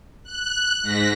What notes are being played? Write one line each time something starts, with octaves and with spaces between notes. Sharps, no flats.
F#6
G#2 A#6 B6